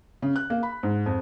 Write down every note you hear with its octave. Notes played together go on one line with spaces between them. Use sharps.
C#3
F#6
A#3
B5
G#2
F2